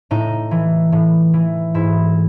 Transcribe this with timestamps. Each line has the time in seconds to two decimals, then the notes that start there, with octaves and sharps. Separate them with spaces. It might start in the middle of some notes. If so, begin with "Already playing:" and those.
0.11 A2 D#4
0.51 E3
0.92 A2
1.34 E3
1.74 G#2 E4